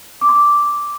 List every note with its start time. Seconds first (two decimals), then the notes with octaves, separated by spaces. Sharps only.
0.21 D6
0.29 C6
0.36 D6